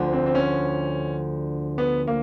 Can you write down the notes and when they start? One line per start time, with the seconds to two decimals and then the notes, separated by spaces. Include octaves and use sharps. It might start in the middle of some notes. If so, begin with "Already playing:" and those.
Already playing: D2 D3 F3
0.13 C4
0.26 C4
0.35 C#4
1.78 B3
2.08 A#3